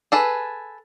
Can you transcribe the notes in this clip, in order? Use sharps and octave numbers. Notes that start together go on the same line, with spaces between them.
G#4 A4 B4